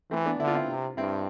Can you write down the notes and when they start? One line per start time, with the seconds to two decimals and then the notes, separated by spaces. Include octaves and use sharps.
0.11 E3 A3 C4
0.26 B3 D4
0.40 D3 E4
0.47 F4
0.55 C4 E4
0.68 C3
0.97 G2 C4 E4